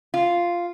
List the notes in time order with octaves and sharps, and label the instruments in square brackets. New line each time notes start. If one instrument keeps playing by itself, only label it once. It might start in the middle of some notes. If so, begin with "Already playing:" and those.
[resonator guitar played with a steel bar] F4